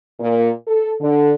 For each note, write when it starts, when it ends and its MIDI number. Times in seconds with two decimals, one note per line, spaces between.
0.20 0.50 46
0.68 0.93 69
1.01 1.32 50